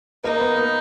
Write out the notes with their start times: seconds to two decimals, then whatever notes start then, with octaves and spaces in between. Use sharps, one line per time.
0.24 A#3 D#4
0.40 B3
0.56 A#3